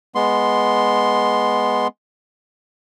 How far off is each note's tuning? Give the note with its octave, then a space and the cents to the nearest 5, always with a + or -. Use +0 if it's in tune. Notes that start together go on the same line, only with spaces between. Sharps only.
G#3 +0 B3 +0 C6 +0